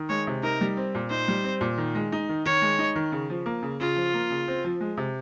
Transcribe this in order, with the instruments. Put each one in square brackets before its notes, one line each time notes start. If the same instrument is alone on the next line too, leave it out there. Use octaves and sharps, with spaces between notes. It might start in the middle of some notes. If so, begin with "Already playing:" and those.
Already playing: [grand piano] D#3
[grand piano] G#3 [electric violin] C#5
[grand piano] C3
[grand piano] D#4 [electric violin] A#4
[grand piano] G3
C4
A#2
[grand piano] D#4 [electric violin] C5
[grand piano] G3
C4
A#2
D#3
G#3
D#4
D#3
[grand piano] D#3 [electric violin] C#5
[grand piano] G#3
D#4
D#3
C#3
F3
A#3
C#3
[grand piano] C#3 [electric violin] F4
[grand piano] F3
A#3
C#3
C4
F3
G#3
C3